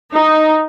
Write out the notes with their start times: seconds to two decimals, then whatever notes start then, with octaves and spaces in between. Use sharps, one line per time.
0.13 D#4